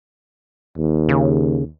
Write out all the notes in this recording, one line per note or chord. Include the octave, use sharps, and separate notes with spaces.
D#2
C#3